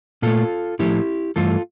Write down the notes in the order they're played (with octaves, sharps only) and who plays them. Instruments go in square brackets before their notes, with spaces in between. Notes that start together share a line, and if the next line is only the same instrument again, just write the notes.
[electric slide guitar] A#2 A3 F4 A4
A2 F3 A3 E4 G4
G2 E3 A3 F4 A4